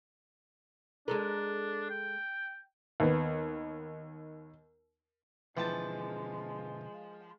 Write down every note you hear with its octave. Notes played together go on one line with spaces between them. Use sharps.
G#3 D4 A4 A#4
G5
D#2 B3
B2 D3 E3 F3 G#3 G5 A5